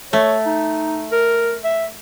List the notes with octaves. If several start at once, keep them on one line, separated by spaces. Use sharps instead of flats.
A3 C#5
D#4
A#4
E5